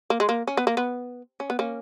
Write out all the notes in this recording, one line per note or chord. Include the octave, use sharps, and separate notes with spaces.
A#3
G#3
A#3
C#4
B3
A#3
B3
C#4
B3
A#3 C#4